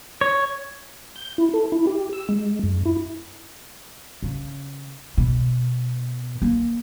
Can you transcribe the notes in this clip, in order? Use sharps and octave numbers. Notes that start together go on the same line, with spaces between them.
C#5
G6
E4
A4
E4
G4
E6
G#3
F#2
E4
C#3
B2
A#3